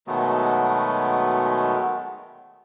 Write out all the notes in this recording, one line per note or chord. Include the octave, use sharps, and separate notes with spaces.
B2 D#3 F#3 G#3 A3 B3